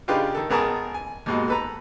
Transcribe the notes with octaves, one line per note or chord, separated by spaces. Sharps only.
C#3 D4 D#4 F4 G4 B4
D#3 A4
G#1 B3 G#4 A#4 A5 D#6
G#5
D#2 G#2 B2
A4 B4 A#5